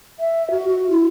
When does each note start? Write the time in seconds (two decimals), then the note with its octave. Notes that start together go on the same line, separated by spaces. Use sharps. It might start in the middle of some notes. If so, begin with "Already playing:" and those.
0.19 E5
0.51 F#4
0.68 F#4
0.91 E4